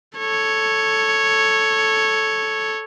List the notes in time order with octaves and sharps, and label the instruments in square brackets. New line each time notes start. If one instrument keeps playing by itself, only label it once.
[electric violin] A4 C#5